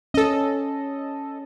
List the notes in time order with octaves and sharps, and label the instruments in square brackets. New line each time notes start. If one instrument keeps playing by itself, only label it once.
[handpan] C#4 [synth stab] A4 D#5